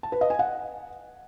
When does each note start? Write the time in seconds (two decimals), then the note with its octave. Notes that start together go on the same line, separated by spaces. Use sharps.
0.03 A5
0.12 B4
0.21 D#5
0.30 G#5
0.39 F#5